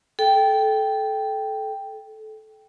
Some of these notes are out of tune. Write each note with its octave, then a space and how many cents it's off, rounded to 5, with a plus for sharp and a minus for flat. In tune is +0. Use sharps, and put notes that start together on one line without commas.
A4 -25 G5 +0